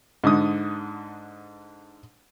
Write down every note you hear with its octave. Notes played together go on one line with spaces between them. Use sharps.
G#2 D3 D#6